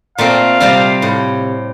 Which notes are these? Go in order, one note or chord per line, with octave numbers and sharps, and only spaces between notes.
A#2 A3 C4 F5
C3 G3 C4 F4
A2